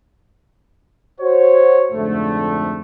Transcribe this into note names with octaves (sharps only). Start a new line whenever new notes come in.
F#4 C5 C#5
F2 G#2 D3 A3